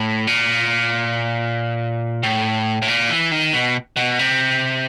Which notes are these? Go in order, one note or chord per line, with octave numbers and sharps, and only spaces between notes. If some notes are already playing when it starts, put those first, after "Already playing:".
Already playing: A2
A#2
A2
A2
A#2
E3
D#3
B2
B2
C3